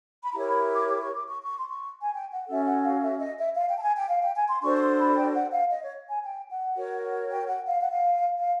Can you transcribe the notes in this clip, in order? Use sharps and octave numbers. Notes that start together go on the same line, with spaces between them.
B5
E4 G4 A#4 C#5 A#5
B5
D6
D6
C#6
D6
C#6
C#6
C6
C#6
G#5
G5
F#5
C#4 F#4 A4 E5
F#5
F5
E5
D#5
E5
F5
G5
A5
G#5
G5
F5
G5
G#5
C6
D4 F#4 A4 C5 C#6
C#6
C6
B5
G5
F#5
F5
D#5
C#5
G#5
G5
F#5
F#4 A#4 C#5
G5
F#5
F5
F#5
F5
F5